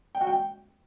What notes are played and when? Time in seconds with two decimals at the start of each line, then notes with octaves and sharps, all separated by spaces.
0.15 G5
0.21 F#4
0.27 G5